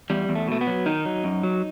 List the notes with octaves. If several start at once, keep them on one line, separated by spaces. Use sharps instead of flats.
E2 G3
E2
A3
B2 A3
B3
F#3
D#3 D#4
F#3
F#2
F#3